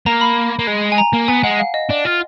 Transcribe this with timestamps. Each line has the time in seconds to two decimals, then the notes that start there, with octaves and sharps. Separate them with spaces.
0.06 A#3 A#5
0.21 B5
0.59 A#3
0.67 G#3
0.92 G#5
0.98 A#5
1.13 A#3
1.28 B3 G#5
1.43 G#3 F#5
1.59 F5
1.74 D#5
1.89 D4
2.05 F4